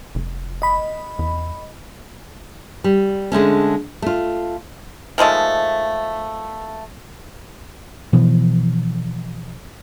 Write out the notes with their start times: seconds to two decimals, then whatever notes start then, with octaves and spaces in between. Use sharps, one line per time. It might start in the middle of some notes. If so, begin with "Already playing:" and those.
0.15 F1
0.62 D#5 B5
1.19 E2
2.84 G3
3.32 D3 G#3 A3 C#4
4.02 A3 F4
5.18 D#3 F3 G#3 A3
8.13 B2 E3 F3